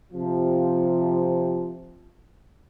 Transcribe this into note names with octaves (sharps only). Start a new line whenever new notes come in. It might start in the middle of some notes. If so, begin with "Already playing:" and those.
C3 F3